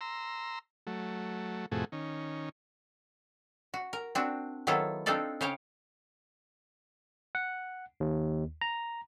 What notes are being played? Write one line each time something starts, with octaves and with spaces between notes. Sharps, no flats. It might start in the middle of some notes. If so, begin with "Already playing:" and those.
A#5 C6 E6
F#3 A3
F2 A2 C3 A3 F#4 G#4
D#3 C#4
F#4
A#4
C4 D4 F#4
D#3 F#3 B3 E4 F4 A4
C4 D4 D#4 F4 A4 D5
C#3 C5 C#5 F5 G5
F#5
D#2
A#5